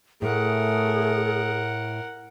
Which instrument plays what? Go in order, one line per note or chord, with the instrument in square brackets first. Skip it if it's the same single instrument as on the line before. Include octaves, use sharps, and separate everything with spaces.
[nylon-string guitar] A2 [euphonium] A3 [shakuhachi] G#4 [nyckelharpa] A#4 F#5